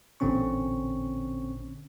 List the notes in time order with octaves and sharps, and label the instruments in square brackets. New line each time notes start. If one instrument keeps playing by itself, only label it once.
[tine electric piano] A1 A#2 D3 C4 C#4 C#6